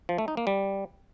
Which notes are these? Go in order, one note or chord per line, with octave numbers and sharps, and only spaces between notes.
F3
A3
D#4
A#3
G3